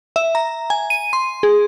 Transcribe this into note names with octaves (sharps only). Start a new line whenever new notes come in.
E5
A#5
G#5
D#7
C6
G#4